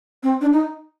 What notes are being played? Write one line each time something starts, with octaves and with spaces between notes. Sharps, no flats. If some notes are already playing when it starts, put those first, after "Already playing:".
C4
D4
D#4